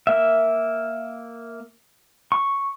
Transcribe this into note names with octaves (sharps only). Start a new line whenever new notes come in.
A#3 E5
C#6